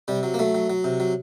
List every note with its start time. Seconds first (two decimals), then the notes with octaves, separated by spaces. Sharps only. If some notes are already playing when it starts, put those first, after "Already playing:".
0.08 C3 G3
0.23 F#3
0.34 A#3
0.39 F#3 A3
0.55 F#3
0.70 F#3
0.84 C3
1.00 F#3